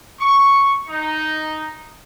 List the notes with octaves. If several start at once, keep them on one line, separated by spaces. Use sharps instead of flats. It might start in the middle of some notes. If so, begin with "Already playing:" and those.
C#6
D#4